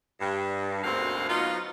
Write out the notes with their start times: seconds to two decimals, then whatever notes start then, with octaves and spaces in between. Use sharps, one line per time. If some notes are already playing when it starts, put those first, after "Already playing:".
0.21 G2
0.84 D2 G#2 B2 A#3 C4 F5
1.30 F#3 B3 D#4 F4